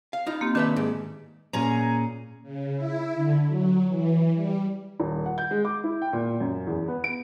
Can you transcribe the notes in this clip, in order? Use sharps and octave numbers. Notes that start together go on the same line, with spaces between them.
F5
D#4 F4
A#3 C4 G4
D#3 D4 B4 E5
G#2
A#2 C#4 G#4 A#5
C#3
E4
D3
F#3
E3
G3
D#1
F#5
G6
G#3
D6
E4
G5
A#2
F#2
E2
B3
D7